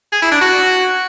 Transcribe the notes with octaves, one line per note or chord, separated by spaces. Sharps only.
G#4
E4
D4
F#4